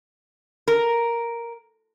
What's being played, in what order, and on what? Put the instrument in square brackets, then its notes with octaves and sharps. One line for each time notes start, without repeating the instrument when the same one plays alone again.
[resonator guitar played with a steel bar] A#4